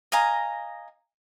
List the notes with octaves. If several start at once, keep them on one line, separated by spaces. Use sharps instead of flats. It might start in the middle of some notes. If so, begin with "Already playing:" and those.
D#5 F5 G#5 A#5